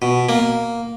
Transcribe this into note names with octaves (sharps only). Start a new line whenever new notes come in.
B2
A#3